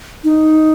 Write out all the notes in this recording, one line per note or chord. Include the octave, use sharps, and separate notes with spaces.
D#4